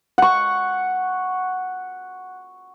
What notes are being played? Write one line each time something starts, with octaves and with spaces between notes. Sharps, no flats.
F#5 C#6